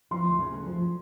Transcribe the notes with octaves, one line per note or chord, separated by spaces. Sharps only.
F3 C6
D2
C#3
D2
F3